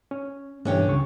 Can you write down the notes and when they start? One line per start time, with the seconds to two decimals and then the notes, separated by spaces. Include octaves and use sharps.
0.11 C#4
0.65 G2 B2 D3 E3 C#4 G4
0.86 C#2 C#3 C#6